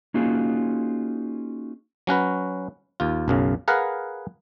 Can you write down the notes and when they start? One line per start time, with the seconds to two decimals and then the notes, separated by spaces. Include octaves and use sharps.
0.14 A#3 C#4 D#4 F4 F#4 G#4
2.07 F#3 C#4 F#4 B4
3.00 D#2 F4
3.28 B1 F#2 C#3
3.68 G#4 A#4 B4 F5 F#5 A#5